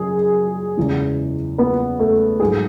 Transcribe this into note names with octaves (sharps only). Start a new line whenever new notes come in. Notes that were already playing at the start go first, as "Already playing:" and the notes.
Already playing: F#2 C#3 G#4
E2 C#3 E3 G#3
B3 B4
A3 A4
G#2 F#3 G#4